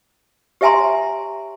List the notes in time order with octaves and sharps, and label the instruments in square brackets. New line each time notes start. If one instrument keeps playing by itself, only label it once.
[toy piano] G4 C#5 E5 G#5 A#5 C6